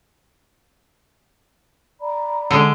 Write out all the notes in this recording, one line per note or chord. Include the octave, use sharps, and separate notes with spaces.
D5 A#5 B5
D3 G#3